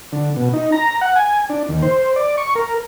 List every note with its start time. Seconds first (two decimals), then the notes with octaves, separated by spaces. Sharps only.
0.12 D3
0.36 B2
0.53 D#4
0.72 A#5
1.01 F#5
1.16 G#5
1.50 D4
1.69 D#2
1.83 C5
2.16 D5
2.38 C#6
2.55 A#4